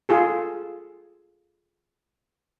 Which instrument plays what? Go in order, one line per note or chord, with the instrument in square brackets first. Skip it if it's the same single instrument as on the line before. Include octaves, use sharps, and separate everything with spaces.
[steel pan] F4 G#4 A4